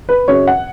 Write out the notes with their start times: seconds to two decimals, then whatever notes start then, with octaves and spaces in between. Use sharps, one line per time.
0.09 B4
0.28 F#2 C#3 F#3 C#5
0.47 F#5